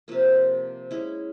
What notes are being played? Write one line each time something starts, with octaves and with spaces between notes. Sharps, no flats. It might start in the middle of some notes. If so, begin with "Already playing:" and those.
C3 F3 A#3
G#3 C#4 E4